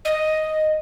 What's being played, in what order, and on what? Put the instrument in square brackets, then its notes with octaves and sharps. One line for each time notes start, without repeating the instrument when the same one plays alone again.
[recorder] D#5